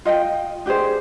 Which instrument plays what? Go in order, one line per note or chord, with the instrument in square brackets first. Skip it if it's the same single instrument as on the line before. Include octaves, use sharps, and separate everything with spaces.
[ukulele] F4 D#5 F#5 G5
D4 G4 G#4 C5